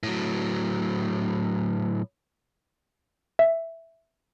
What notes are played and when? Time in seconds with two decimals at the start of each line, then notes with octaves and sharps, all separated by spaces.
0.03 A2 F#3
3.39 E5